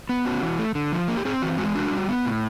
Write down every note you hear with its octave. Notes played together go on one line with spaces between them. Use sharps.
B3
C#4 F#4
E3
A3
D3
F3
A#3
G4
C4 G#4
E3 F#4
G#3 F#4
D4 F#4
G3
B3
A2